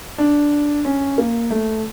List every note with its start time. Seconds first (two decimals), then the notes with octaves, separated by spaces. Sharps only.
0.18 D4
0.85 C#4
1.18 A#3
1.50 A3